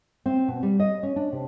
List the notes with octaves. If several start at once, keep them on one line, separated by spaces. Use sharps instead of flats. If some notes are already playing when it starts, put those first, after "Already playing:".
C4
B2
G3
D#5
C#4
D4
C3